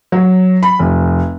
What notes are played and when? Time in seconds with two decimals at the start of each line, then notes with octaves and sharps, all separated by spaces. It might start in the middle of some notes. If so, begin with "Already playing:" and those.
0.12 F#3
0.63 B5
0.79 F1